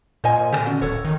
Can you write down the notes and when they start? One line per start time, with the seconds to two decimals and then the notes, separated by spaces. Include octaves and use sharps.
0.24 A#2 C5 D#5 G#5
0.53 D3 G4 D#5
0.66 C#4 F#4
0.81 D1 A4 C#5
1.05 D#3